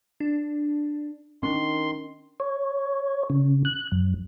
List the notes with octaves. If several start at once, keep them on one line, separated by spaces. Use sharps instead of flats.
D4
D#3 C#4 D4 C6
C#5
C#3
F#6
F#2